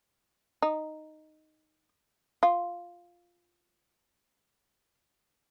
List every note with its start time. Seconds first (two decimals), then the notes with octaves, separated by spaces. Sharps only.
0.62 D#4
2.43 F4